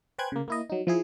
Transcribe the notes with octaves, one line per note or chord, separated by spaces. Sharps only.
B4 C5 G5 G#5 F#6 G#6
C#3 A#3
A#3 E4 D#5
F#3 D#4
F3 E4 G#4